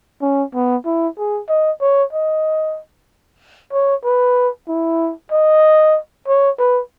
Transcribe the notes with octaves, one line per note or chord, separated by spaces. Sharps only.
C#4
B3
E4
G#4
D#5
C#5
D#5
C#5
B4
E4
D#5
C#5
B4